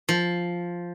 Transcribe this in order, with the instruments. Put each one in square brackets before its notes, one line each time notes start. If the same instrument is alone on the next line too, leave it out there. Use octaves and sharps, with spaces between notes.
[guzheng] F3